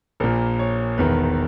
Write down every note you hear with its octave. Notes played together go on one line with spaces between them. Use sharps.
A#1 A#2 A#4
C#5
E1 E2 D#3 B4